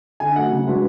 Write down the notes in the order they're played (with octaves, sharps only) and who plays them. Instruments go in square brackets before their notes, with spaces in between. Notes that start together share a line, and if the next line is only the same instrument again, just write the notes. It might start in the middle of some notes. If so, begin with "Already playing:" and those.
[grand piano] D3 [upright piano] G#5
[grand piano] F#3 A3 [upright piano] F#5
[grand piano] C#3
G#3 D4 F#4 B4